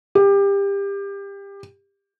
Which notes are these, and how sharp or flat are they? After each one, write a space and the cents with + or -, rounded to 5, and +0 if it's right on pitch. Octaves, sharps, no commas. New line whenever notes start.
G4 +25